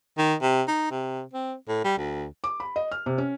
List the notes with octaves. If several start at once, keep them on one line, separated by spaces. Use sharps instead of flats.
D#3
C3
D#4
C3
C4
A2
G3
D2
D6
B5
D#5
F6
C3
C#4